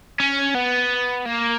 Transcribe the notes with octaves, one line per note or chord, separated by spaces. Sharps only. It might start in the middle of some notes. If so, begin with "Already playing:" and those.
C#4
B3
A#3